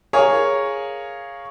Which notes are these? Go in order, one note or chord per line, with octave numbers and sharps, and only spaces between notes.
G#4 A#4 C#5 F5